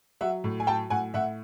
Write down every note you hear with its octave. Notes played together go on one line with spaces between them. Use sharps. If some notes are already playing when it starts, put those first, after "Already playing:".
F#3 E5 F#5
A2
G#5
F#3 G5 A5
A2 F#5 G#5
A2 E5 F#5